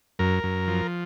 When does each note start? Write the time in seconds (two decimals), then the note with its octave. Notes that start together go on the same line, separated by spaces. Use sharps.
0.19 F#2 A#4
0.43 F#2
0.68 F3